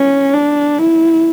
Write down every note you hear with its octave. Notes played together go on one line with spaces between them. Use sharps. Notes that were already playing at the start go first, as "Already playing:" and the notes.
Already playing: C#4
D4
E4